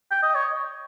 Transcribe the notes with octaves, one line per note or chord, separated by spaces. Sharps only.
G5
D#5
C#5